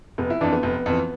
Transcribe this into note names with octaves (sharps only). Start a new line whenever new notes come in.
F1 B3
E4
F2 E3 D4
B3
F1
F2 E3